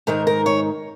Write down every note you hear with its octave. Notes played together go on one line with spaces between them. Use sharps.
G#2 D#3 G#3 A#4
A#4
C#5